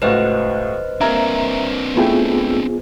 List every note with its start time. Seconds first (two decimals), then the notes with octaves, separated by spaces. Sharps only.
0.02 C#2 A2 F#4 B4 C5 D#5
1.01 A#3 C4 D4 A#4 E5 A#5 G#6
1.96 A3 B3 E4 F4 G#4 G5